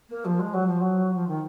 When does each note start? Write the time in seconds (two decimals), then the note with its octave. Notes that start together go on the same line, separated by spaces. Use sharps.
0.09 A#3
0.24 F3
0.39 G#3
0.53 F#3
0.66 F3
0.80 F#3
1.14 F3
1.27 D#3